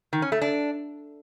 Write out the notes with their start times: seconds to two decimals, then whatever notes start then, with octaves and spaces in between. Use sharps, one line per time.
0.13 D#3
0.22 C#4
0.32 A3
0.41 D4